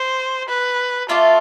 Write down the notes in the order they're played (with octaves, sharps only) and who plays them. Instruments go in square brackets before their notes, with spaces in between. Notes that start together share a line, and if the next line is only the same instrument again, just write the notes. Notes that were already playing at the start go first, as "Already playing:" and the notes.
Already playing: [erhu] C5
B4
[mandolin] A3 E4 A4 D5 [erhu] F4